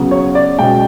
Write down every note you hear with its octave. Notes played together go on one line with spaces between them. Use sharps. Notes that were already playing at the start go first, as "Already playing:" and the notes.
Already playing: C#3 F#3 B3
C#5
D5
B2 G#3 C#4 G5